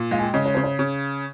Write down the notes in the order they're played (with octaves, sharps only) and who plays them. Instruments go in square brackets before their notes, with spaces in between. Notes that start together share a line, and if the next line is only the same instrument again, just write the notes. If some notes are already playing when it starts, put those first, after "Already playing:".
Already playing: [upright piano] A#2
[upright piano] G#3 [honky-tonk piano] F5
[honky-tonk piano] G#5
G5
[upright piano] C#3 [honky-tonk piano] D#5
[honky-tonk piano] C#5
[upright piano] C#3 [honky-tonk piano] C5
[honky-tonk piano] C#5
[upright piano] C#3